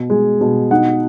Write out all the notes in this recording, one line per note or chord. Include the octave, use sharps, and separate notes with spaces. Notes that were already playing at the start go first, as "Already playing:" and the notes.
Already playing: B2
G#3
B2
D#4 F#5